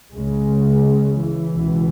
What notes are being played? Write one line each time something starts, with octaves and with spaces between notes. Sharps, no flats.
C#2 C#3 G#3
E3
C#2 B2